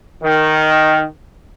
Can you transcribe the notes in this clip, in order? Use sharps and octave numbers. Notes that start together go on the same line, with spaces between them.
D#3